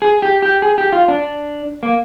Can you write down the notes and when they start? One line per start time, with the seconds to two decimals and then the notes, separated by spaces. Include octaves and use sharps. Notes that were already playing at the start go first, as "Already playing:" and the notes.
0.02 G#4
0.22 G4
0.42 G4
0.62 G#4
0.78 G4
0.92 F4
1.08 D4
1.83 A#3